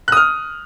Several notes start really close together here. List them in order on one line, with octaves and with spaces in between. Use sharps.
F#6 D#6 F6